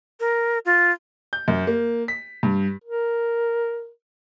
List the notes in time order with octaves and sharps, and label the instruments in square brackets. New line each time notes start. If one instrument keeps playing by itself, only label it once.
[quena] A#4
F4
[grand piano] G6
F#2
A#3
B6
G2
[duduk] A#4